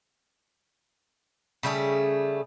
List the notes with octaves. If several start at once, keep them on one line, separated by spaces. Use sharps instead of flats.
C#3 G3 A3 G#4